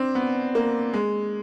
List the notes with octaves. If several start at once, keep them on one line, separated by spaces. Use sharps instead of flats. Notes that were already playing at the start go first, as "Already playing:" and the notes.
Already playing: C4 D4
B3
A#3
G#3